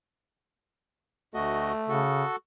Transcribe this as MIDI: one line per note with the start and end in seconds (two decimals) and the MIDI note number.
1.34 1.72 38
1.34 2.04 57
1.34 1.72 66
1.34 1.72 75
1.89 2.24 49
1.89 2.36 66
1.89 2.36 69